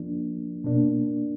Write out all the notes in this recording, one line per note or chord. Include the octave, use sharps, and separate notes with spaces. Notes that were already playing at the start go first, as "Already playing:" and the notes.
Already playing: F3 A#3 D4
B2 A#3 D4